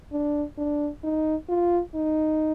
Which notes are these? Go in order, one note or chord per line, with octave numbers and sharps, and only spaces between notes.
D4
D4
D#4
F4
D#4